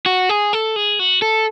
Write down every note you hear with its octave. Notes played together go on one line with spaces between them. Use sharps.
F#4
G#4
A4
G#4
F#4
A4